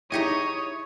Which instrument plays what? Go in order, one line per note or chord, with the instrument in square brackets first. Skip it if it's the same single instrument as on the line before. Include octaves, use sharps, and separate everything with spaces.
[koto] D#4 G4 G#4 [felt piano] E4 [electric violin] C#5 [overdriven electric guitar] D#5